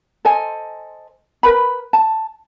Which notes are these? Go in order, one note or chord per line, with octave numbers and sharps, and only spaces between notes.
A4 C5 D#5 G#5
A#4 B4 B5
A5